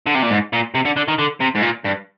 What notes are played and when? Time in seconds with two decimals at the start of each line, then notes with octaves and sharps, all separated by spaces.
0.06 D3
0.15 C3
0.22 A#2
0.30 G#2
0.53 A#2
0.75 C3
0.85 D3
0.97 D3
1.08 D#3
1.19 D3
1.41 C3
1.55 G#2
1.62 A#2
1.85 G2